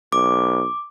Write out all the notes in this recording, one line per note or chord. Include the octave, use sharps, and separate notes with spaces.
B1 D6